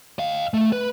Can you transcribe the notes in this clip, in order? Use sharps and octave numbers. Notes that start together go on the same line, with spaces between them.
D#5 F5
A3
B4